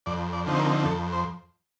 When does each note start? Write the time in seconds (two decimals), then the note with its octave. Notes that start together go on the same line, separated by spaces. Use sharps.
0.06 F2 D5
0.33 D5
0.47 D3 F3 C4 D#4
0.55 C5
0.59 A#4
0.85 F2 A4
1.13 C5